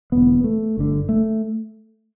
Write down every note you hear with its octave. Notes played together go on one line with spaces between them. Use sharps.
E1 E2 D3 B3
A3
G1 G2 D3
A3